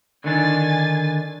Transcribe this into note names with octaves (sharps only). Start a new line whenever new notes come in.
D3 D#3 D4 G#5 A6